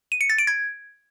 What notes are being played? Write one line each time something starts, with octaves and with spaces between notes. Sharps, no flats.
D#7
C#7
A6
D7
G#6